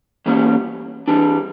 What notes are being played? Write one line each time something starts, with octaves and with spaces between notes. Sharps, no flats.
E3 G3 A#3 C#4
E3 G3 D4